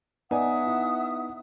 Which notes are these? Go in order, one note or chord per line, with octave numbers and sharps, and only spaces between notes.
B3 D#4 D5 E5 F#5 G#5 D#6
E4